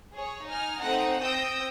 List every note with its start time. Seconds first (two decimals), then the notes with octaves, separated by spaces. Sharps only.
0.14 G#4 C#5
0.47 D#4 G#5 F6
0.83 A3 C4 D#4 F#5
1.21 C4 G5 D#6 E6 G6 A#6